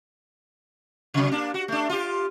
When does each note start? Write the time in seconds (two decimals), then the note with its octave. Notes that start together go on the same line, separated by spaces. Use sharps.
1.14 C3 F#3
1.32 A#3 D4
1.54 F#4
1.68 A3 D4
1.89 F4 G4